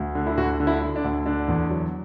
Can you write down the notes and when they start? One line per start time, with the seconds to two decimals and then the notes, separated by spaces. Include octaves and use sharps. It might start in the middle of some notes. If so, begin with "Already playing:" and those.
Already playing: D2
0.15 D3
0.27 E4
0.37 D2 F#4
0.60 D3
0.67 E4
0.82 D3
0.96 D4
1.04 D2
1.26 D3 D4
1.48 E2
1.70 F#3